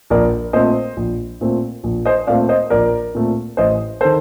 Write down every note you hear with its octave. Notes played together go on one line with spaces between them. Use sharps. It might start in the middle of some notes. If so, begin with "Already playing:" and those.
A#1 A#4 D5
A#2 A3 C4 C5 D#5
A#1
A#2 A3 C4
A#1
C5 D#5
A#2 A3 C4 D5 F5
C5 D#5
A#1 A#4 D5
A#2 A3 C4
A1 C5 D#5
D#3 A4 C5